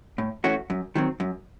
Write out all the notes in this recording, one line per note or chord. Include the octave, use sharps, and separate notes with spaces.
A2
E3 A3 C#4 F#4
F#2
D#3 F#3 C4
F#2